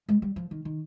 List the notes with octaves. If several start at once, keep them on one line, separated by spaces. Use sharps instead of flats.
G#3
G3
F3
D#3
D#3